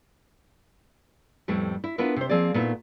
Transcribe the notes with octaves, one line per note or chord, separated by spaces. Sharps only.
F2 A2 G3 A3 B3
E4
B3 D4 E4 F4 A#4 B4
C3 C5
F3 A#3 C4 G#4 D5
A#2 A3 B3 D#4 E4